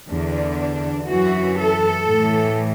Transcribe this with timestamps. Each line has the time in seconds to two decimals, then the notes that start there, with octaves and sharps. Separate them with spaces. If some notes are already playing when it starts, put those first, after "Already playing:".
0.08 E2 D3 D4
1.08 F#2 E3 F#4
1.57 A4
2.06 A2 E3